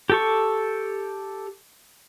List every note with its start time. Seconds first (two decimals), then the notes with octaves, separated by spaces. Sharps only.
0.10 G4 A4 C#6